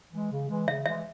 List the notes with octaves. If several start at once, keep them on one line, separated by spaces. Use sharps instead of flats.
E3 G#3
C#3
E3 G#3
C#3 E5
E3 G#3 E5